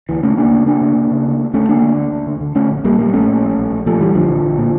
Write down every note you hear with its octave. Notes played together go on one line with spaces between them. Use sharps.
D2 E3
C#3 A3 C#4
C#3 A#3 D4
C#3
D2 A#3 D4
C#3
C#3
C#3
D2
D2
D2 A3 C#4
D3 A#3 D4
D3
D2
D2
D3
D3
D3 A3 C#4
A#1
A#1 G3 A#3
A#2 G3 A#3
A#1 A3 C#4
A#2
A#1
A#1
A#1
A#2 F3 A3
A#1 E3 G3
A#1 D3 F3
A#1
A#1
A#2